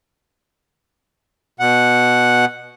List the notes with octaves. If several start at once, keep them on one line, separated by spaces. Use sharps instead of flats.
B2 F#5